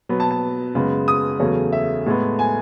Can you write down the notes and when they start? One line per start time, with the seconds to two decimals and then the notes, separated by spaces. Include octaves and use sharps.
0.09 B2 F#3 B3
0.20 A5
0.31 A5
0.74 F#2 C#3 G#3 B3
1.08 D#6
1.40 E2 C#3 F#3 A3 C#4
1.72 E5
2.06 A2 G#3 B3
2.39 G#5